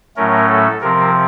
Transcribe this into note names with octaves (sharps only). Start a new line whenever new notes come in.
A2 F#3 A3 C#4 A#4
A4
C3 F3 C4 A#4